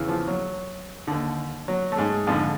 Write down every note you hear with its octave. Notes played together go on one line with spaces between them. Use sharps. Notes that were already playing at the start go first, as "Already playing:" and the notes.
Already playing: E2 C#3 E3
F3
F#3
D#2 D3
F#3
A3
G#2 G#3
F2 G#2 D3 G#3